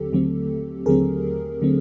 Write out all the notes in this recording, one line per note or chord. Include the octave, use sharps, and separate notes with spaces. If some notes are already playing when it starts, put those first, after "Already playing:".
Already playing: D#2 D3 F#3 C4 G4 A4
D#2 D3 F#3 A3 C4
D#2 D3 F#3 A3 C4 G#4 A#4
D3 F#3 A3 C4